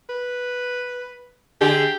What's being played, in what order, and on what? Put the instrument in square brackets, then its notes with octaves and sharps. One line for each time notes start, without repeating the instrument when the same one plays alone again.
[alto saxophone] B4
[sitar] D3 G#4 [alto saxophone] G4